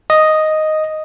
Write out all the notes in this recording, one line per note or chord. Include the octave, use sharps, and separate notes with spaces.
D#5